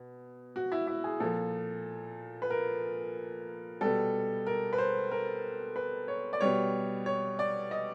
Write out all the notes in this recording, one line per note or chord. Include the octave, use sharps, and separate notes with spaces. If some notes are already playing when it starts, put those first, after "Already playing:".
Already playing: B2
F#4
E4
E4
G#4
A#2 F3 A4
B4
A#4
B2 G3 A4
A#4
B4
C5
A#4
B4
C#5
D5
B2 G3 C#5
C#5
D5
D#5